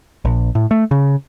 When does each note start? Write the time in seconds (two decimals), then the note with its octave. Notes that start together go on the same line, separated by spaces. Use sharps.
0.25 A#1
0.55 A2
0.71 A3
0.91 C#3